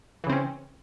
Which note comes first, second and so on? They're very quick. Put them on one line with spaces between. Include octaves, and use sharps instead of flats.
E3 C#3 C4 C#4